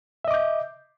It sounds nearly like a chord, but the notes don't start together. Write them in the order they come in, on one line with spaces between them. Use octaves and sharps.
E5 D#5 D6 G6